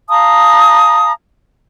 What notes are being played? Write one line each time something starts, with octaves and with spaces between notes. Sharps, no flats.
F5 A5 A#5 D#6